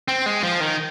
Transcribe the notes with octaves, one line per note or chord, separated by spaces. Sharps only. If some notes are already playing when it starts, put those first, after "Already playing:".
C4
G#3
F3
D#3